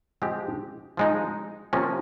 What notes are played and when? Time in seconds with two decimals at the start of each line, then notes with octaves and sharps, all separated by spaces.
0.22 F3 G#3 C4 G4
0.97 F3 G#3 D#4
1.73 C3 F3 A#3 C#4